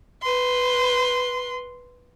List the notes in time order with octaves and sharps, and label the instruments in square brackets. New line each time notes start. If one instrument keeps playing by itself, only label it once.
[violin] B4 C6